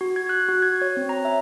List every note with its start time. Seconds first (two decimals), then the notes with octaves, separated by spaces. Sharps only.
0.01 F#4
0.16 G#6
0.29 F#6
0.49 F#4
0.62 G#6
0.82 C#5
0.97 C4
1.09 A#5
1.25 E5